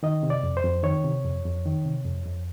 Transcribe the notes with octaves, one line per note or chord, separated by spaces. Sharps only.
D#3 D#5
C3
D5
F2
C5
F2
D#3 C#5
C3
F2
F2
D#3
C3
F2
F2